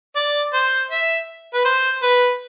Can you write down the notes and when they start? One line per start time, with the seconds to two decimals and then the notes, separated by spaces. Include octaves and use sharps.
0.16 D5
0.53 C5
0.91 E5
1.54 B4
1.65 C5
2.03 B4